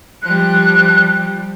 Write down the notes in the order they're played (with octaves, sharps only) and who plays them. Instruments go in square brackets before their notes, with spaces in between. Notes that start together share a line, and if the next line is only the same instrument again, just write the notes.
[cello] F3 G3 [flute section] F#6